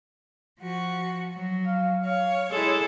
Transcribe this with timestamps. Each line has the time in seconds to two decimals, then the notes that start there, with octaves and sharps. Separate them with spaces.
0.60 F3 F#4
1.33 F#3
1.66 F5
2.04 C#5 F5
2.51 G#3 E4 G#4 A4